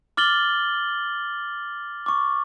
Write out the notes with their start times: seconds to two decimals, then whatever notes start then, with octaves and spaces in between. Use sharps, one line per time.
0.17 D6 F6 A6 F#7 G7
2.06 C#6 D6